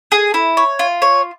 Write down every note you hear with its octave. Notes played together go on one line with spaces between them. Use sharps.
G#4
E4
C#5
F4
C#5